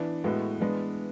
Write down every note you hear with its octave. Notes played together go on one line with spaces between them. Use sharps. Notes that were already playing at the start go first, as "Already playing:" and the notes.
Already playing: E3 B3 D4
A2 G#3 B3 F#4
E3 G#3 B3 D4